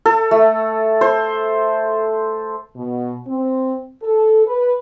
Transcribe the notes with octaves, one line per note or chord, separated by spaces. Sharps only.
A4
A3
C5
B2
C4
A4
B4